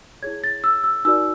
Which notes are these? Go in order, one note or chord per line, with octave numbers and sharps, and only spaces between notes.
E4 G#4 C#5 G#6
A6
E6
E6
D#4 F#4 A#4 D5 E6